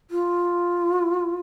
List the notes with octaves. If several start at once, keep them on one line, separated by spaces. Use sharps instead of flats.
F4